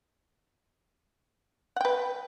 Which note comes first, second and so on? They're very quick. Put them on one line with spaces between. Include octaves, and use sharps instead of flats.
F#5 G5 B4